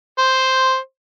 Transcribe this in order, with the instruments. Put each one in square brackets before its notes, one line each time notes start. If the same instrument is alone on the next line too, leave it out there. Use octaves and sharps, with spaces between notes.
[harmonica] C5